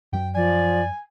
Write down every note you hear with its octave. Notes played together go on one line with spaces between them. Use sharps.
F#2 F#3 G5
F3 D5 G#5